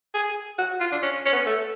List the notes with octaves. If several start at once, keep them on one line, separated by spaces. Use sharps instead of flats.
G#4
F#4
F4
D4
C#4
C#4
B3
A3